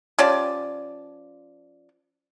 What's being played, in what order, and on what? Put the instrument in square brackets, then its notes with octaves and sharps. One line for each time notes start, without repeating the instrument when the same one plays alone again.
[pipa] F3 C#4 G4 D5